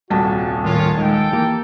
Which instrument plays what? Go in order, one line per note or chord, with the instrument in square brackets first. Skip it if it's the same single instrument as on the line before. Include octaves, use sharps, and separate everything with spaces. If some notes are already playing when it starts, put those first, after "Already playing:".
[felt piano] D#1 C2 A5 [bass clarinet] F#4
[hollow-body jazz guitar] A2 [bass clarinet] D#3 [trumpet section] F4 C#5
[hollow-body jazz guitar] D#3 [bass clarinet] G#3 [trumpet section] A4 G5
[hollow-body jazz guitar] E3 G4 A#4 [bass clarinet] A#3